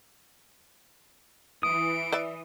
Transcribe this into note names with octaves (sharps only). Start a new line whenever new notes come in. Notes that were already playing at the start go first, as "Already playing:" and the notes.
E3 D#6 D7
B4 D5 E5